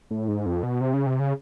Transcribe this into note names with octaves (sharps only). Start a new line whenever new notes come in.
A2
G#2
F2
B2
C3
C#3
C3
C#3